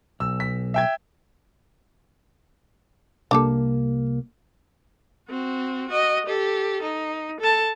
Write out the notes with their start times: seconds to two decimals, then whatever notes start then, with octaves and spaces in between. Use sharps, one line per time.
0.20 B1 E6
0.40 B6
0.74 E5 G5 G#6
3.31 C2 A#3 D4 G4 A4
5.29 C4 F#4
5.88 F#4 D#5
6.26 G4 A4
6.83 D#4
7.40 A4 A5